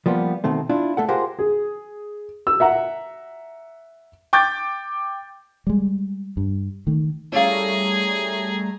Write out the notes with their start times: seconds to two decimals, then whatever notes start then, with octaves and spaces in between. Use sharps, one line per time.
0.06 F3 G3 A#3 B3
0.44 B2 D#3 A3 C4
0.69 D4 E4 F4
0.97 A3 A4 F#5
1.08 F4 G4 G#4 A#4 C5 F#5
1.39 G#4
2.47 E6
2.60 E5 F#5 A#5
4.33 G5 D6 G6 A6
5.67 G3 G#3
6.37 G2
6.87 D#3 A3
7.32 G3 A3 C#4 E4 G#4 D5 F5 A#5